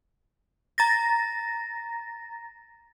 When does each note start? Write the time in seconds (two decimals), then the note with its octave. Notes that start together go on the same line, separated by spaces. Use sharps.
0.78 A#5 A6 A#6